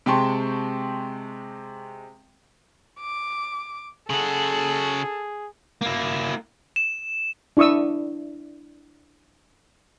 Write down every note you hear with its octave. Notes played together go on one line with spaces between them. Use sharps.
C3 G#3 G5 A5 C6 C#6
D6
C#3 F#4 G#4 A4
A#3 E4
E7
D4 E4 C#6 D#6 E6